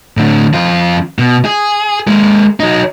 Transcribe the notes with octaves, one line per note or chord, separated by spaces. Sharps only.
A2 D3
F2 F4
B2
G#4
G#3 A#3
F#3 D#4